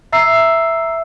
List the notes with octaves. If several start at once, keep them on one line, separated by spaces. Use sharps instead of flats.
E5 A#5 E6 C7